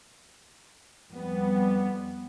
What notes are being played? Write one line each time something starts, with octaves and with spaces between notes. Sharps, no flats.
F2 G3 B3